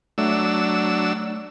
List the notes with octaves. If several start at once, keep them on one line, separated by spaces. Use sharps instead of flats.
F#3 A3 D4 E6